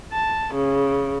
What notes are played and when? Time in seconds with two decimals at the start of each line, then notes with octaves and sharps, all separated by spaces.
0.13 A5
0.53 C#3